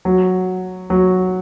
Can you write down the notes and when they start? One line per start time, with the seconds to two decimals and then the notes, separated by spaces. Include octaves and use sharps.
0.05 F#3
0.90 F#3